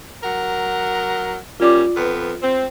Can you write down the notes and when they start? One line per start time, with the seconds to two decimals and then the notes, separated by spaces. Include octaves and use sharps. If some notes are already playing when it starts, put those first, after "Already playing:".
0.23 F#3 A#4 F#5
1.60 G3 A#3 C#4 F4 D5 D6
1.96 F2 B3 B4
2.42 C4